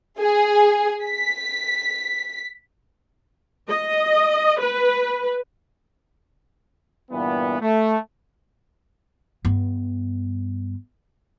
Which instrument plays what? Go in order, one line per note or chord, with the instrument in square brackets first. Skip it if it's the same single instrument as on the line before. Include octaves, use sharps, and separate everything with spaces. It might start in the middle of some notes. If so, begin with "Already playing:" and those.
[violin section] G#4
B6
[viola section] D#5
B4
[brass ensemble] G2 A#2 E3 B3
A3
[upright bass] G2 B3